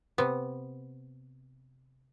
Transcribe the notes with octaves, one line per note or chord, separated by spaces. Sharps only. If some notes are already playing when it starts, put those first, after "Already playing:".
C3 B3